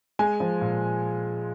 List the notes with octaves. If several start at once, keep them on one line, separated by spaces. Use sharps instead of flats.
G#3 G#5
F3
A#2